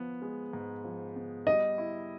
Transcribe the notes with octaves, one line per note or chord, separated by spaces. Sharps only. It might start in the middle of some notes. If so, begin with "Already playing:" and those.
Already playing: F3 B3
G#3
G#2
F3
B3
G3 D#5
E4